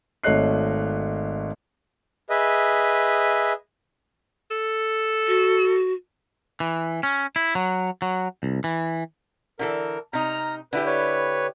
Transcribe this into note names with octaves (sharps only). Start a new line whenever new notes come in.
G#1 A3 C#5 D#5 F#6 C7
G#4 B4 D#5 E5
A4
F#4
E3
C#4
E4
F#3
F#3
C2
E3
D3 E3 A4 A#4
C3 D#4 A#5 F6
D3 E4 G4 B4
B4 C#5